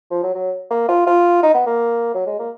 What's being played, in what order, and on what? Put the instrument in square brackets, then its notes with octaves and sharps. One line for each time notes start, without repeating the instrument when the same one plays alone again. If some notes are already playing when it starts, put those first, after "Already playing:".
[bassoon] F3
F#3
F#3
A#3
F4
F4
D#4
B3
A#3
F#3
G#3
A#3